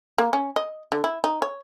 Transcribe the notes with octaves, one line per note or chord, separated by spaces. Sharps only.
A#3
C#4
D#5
D3
E4
D#4
C#5